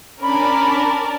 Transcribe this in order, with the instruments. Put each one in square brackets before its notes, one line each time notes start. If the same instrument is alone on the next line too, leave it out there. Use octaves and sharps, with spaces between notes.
[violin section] C#4 D4 [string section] A#4 D5 A5 [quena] B5